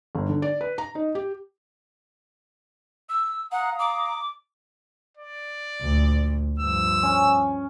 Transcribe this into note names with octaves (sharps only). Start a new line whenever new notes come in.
G1
D3
D5
B4
A#5
D#4
G4
E6
F5 F#5 A#5 D#6
D6
D5
D2 A#2
G2 F3 E6
C#4